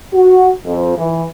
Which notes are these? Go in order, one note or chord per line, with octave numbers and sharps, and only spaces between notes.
F#4
F2
E3